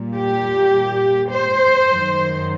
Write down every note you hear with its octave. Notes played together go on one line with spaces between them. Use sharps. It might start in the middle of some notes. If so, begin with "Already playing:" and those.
Already playing: A#2 G3
G4
C5
F#2 D#3 F#3